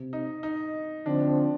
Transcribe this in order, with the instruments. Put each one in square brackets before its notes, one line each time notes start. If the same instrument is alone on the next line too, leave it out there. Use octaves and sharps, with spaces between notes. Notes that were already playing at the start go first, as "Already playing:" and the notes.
Already playing: [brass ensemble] C3
[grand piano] D#4
D#4
[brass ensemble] D3 F3 C4 [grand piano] D4